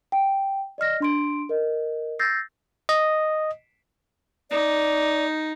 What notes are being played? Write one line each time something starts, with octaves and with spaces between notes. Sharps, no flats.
G5
D5 D#5 F6 A#6
D4 C6 D7
A#4 D#5
E6 G6 A6 A#6 C7
D#5
D#4 D5